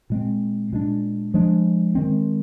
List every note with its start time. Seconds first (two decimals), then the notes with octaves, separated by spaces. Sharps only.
0.10 A#2 G#3 C4
0.73 A#2 G#3 D4
1.34 F3 G#3 D4
1.95 D#3 G#3 C4